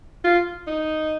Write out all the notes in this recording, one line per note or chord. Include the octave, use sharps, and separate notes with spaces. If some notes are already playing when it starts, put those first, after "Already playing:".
F4
D#4